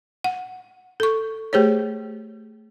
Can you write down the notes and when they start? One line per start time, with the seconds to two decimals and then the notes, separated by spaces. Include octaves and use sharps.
0.24 F#5
1.00 A4 C#6
1.53 A3 G4 G#4 C5 C#5